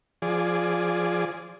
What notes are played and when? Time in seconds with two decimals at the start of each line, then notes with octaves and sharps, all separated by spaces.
0.22 F3 G#4 D5